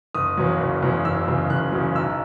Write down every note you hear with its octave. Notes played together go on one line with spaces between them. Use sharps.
F#1 D#6
E2 C#3 F#3
F#1
E2 C#3 F#3
F#1 E6
E2 C#3 F#3
F#1 F#6
E2 C#3 F#3
B1 E6